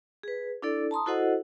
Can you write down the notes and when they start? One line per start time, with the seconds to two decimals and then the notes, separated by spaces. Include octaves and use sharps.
0.23 G#4 B4
0.62 D4 E4 A4 D5
0.91 A5 A#5 C6 D#6
1.06 E4 F#4 A4 C5 D#5 F#5